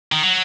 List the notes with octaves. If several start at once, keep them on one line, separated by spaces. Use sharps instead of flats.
D#3
F#3